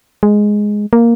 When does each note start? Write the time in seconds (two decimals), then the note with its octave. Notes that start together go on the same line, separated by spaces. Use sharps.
0.23 G#3
0.93 A#3